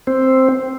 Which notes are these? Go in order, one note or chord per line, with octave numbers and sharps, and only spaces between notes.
C4